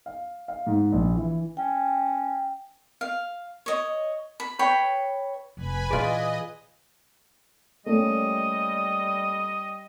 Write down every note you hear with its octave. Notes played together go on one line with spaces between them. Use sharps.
F5
F5
G#2
A#1
E3
C#4 G5
F5
C#5 D#5
B5
B4 C#5 G5 B5
F1 B4 G#5 B5
A#2 E3 F4 G#4 D5 D#5
G3 A3 A#3 C#4 D#5